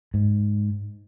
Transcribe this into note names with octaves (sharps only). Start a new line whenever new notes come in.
G#2